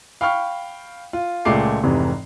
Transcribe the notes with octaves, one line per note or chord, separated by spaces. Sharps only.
F5 G5 B5 C#6 F6
F4
C#2 A#2 G#3 A3 D6 C7
F1 G#2 C3 E3